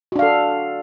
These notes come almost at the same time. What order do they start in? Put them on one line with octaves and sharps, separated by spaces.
F#4 D4 F5 A4